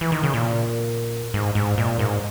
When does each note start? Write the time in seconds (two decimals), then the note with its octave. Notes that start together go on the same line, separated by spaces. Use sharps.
0.01 E3
0.12 D#3
0.23 C#3
0.34 A#2
1.34 G#2
1.55 G#2
1.78 A#2
1.99 G#2